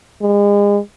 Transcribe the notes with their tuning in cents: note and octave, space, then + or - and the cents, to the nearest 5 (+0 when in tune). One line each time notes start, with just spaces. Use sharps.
G#3 -35